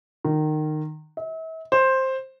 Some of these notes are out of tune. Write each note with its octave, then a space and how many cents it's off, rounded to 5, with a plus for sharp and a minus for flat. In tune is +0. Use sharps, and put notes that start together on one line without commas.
D#3 -20
E5 -40
C5 +10